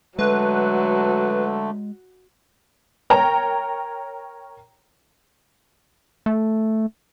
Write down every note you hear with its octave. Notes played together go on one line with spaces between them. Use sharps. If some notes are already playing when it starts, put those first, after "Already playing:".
D3 F#3 G#3 A3 B4
A#4 C#5 G5 A#5
A3